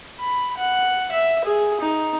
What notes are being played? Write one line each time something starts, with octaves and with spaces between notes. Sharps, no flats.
B5
F#5
E5
G#4
D#4